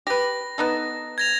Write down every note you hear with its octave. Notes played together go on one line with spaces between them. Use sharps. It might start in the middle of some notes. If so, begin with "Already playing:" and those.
G4 B4 A#6
B3 D#4 A4
G#6 A#6 F7